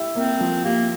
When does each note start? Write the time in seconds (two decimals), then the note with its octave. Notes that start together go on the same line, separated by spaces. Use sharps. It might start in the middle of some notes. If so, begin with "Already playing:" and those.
Already playing: E4 G4
0.16 A#3 C4
0.41 F3
0.64 A#3 G4